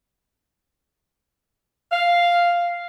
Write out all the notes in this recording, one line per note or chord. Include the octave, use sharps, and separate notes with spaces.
F5